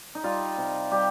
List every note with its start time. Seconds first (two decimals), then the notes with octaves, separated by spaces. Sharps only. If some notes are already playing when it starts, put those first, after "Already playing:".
0.15 D#4
0.23 G3 F4
0.58 C3
0.91 G3 G4